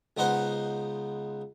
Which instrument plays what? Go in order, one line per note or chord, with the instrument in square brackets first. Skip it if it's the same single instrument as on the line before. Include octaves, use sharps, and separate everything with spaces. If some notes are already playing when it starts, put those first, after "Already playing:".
[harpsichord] C#2 B3 D#4 C5 F#5